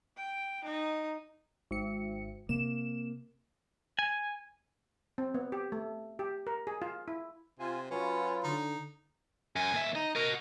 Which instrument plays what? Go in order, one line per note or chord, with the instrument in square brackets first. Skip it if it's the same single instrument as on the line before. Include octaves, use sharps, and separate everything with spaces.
[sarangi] G5
D#4
[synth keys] G#1 C#7
[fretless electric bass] C3 A#3 [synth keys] E7
[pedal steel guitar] G#5
[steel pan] C4
B3
G4
A3
G4
A#4
G#4
F4
E4
[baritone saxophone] C3 [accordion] F4 G#5
[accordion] F#3 F4 [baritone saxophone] C#4 [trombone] B4
[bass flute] D3 [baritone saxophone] D#4
[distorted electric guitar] F#2 [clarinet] G#5
[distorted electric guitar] D#2 E5
[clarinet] D#4 [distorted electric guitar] D#5
[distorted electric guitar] F#4 D#5 [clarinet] A#4